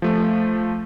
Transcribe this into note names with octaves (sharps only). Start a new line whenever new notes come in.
F3 A3